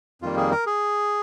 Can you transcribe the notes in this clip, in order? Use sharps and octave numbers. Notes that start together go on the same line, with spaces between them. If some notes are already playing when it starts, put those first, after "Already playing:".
F2 D#3 G3 A#3 F4
G#4
A#4
G#4